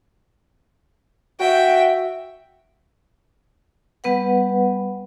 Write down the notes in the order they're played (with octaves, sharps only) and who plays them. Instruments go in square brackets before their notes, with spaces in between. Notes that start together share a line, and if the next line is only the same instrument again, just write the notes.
[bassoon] F#4 [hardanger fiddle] E5 G5
[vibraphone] G3 B3 B4 F#5